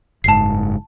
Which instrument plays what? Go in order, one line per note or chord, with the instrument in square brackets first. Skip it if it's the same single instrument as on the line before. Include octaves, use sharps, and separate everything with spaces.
[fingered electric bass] F#1 G#2 [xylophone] A5 C7